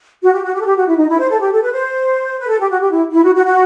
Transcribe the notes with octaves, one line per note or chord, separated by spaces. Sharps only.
F#4
G4
F#4
G4
A4
G4
F#4
E4
D#4
E4
C5
A4
G4
A4
B4
C5
B4
A4
G4
F#4
G4
E4
E4
F#4
F#4
F#4